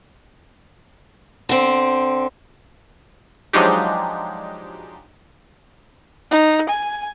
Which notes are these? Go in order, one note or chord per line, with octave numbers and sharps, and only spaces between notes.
D3 C4
F3 F#3 G#3 D4 D#4 G4
D#4
G#5